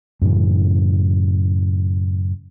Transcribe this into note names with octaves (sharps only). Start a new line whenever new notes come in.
F#2 A2 C#3 E3